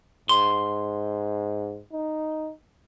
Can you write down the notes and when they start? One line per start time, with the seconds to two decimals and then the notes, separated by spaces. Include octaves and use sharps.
0.29 G#2 C6
1.92 D#4